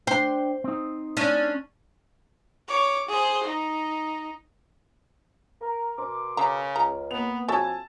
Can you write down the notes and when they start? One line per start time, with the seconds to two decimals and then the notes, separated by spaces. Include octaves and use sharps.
0.07 D4 C5 G5
0.64 C4 D#4
1.17 C#4 D4
2.68 C#5 D6
3.09 G#4 C5
3.43 D#4
5.61 A#4
5.98 B2 A#4 C6 D6
6.37 C#3 G#4 E5 A#5
6.76 C#2 A#5
7.11 A#3 B3 F7
7.49 F2 F#4 C#5 E5 G#5 A5 E6 A6